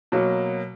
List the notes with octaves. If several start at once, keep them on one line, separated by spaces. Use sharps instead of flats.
B2 F#3 A#3